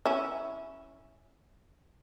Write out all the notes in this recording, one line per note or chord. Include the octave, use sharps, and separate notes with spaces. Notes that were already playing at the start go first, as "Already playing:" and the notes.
C#4 E4